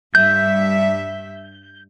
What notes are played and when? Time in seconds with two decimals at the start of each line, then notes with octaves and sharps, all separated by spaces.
0.15 G2 E5 G6